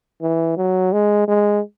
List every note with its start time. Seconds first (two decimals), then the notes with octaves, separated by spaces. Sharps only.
0.22 E3
0.58 F#3
0.93 G#3
1.28 G#3